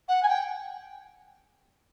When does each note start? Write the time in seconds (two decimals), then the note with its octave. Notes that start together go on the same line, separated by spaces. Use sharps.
0.08 F#5
0.23 G#5
0.28 G5